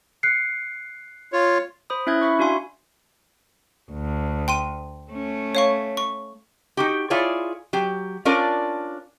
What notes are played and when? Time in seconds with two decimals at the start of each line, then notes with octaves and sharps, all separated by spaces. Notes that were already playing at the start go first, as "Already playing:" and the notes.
0.23 F#6 C7 C#7
1.33 F4 C#5
1.90 C5 B5 D#6
2.07 C#4 E4 E5 F#6 G#6
2.21 E5 B5 C#6
2.39 D4 F#4 F5 G#5 C6
3.91 D2
4.48 G5 C6 D#7
5.11 A3 C#4
5.55 C#5 F5 C#6
5.97 C#6
6.77 D#4 F#4 G4
7.10 E4 F4 G#4 C#5 D5
7.73 F#3 G4
8.25 C#4 D4 F4 A#4 D5